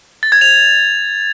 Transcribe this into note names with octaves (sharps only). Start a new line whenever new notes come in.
A6
G#6
F7